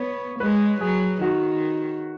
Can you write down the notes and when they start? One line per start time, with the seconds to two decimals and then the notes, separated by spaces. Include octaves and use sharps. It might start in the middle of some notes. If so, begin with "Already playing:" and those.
Already playing: B3 C#5
0.40 G#3 B4
0.81 F#3 G#4
1.21 D#3 F#4